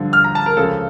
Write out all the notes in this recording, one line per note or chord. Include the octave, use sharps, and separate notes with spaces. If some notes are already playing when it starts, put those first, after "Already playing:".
Already playing: G2 D3 F3
F6
A#5
A5
A#4
C#2 C#3 F3 A4